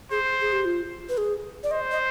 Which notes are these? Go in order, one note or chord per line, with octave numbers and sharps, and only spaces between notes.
G#4 C5
G#4
G4
F4
B4
G#4
D5
C5 D#5
D#5